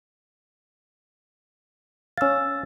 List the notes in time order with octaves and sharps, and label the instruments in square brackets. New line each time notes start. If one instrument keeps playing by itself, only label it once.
[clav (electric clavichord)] C#4 F5 [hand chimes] E6 A6